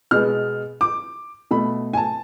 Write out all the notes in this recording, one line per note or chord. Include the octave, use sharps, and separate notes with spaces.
B2 G#3 B3 F6
D6
B2 A3 B5
G#5
A5